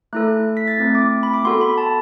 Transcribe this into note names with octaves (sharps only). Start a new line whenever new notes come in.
A3 E4 A4 F#6
B6
A6
A3 C4 E4
D6
B5
D6
B3 F#4 A4 C6
B5
A5